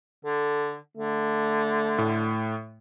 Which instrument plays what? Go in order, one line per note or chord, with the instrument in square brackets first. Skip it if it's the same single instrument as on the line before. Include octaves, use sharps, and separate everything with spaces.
[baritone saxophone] D3 [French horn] A4
[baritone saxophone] D3 [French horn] A3
[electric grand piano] A2